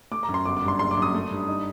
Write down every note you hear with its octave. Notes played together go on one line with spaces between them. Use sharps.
A3 D6
A#5
F#2
C6
G1 D6
D6
G2
C6
F#1 C6
D6
F#2
D#6
A3
G2
D#4